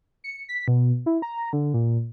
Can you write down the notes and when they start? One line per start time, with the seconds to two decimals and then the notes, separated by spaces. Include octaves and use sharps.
0.24 C#7
0.49 B6
0.68 B2
1.06 E4
1.22 A#5
1.53 D3
1.74 A#2